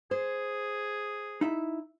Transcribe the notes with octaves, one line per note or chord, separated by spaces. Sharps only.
G#4 C5
D#4 E4 E5